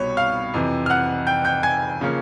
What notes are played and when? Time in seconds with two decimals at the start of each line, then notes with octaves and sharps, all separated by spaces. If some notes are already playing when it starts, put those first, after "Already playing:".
Already playing: C2 B2 G3 C#5
0.17 F5 F6
0.54 F2 C3 E3
0.86 F6
0.90 F#5 F#6
1.27 G5 G6
1.45 G5 G6
1.63 G#5 G#6
2.01 C#3 F3 A#3 C#4